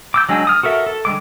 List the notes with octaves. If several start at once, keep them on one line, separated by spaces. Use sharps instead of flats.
D6 E6 G6
F#3 G#3 D4 G#5 E6
D#6 F6
F#4 A4 A#4 E5
A4
D3 G3 G#3 D6